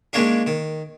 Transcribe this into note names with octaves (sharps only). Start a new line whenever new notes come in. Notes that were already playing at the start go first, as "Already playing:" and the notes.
D#3 G#3 A#3 C#4 D4 G#4
D#3